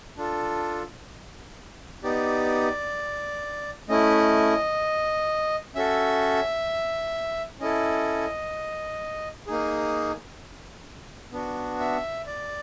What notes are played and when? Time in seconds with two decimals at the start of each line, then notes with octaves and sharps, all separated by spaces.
0.17 D4 F4 A4
2.03 B3 D#4 G4 D5
3.89 A3 C#4 E4 D#5
5.75 C#4 F#4 A4 E5
7.60 C#4 E4 A4 D#5
9.47 A#3 D#4 G#4
11.32 B3 D4 F#4
11.80 E5
12.26 D5